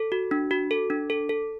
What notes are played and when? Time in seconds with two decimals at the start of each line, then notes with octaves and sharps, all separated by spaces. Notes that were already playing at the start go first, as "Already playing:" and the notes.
Already playing: A4
0.12 F#4
0.31 D4
0.51 F#4
0.71 A4
0.90 D4
1.10 A4
1.29 A4